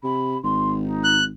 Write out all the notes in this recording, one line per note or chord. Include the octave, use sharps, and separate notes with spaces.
C3 B5
G#1 C6
D#4
F#6